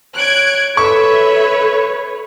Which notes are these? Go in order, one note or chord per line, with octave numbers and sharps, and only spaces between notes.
C#5 F#6 G#6 D7
A4 B4 C#5 E5 C#6